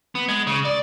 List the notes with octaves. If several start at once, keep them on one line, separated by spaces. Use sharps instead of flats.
B3
G#3
C#3
D5